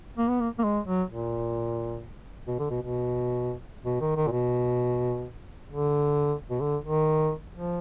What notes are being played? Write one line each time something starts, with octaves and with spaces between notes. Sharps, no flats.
A#3
B3
A#3
A#3
G#3
F#3
A#2
B2
D3
B2
B2
B2
D#3
D#3
A#2
B2
D3
B2
D3
D#3
F3